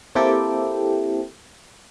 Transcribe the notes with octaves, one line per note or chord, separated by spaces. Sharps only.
A#3 C4 E4 G4 A4 G5